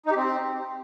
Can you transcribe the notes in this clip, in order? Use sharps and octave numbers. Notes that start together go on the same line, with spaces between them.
D#4
G4
C4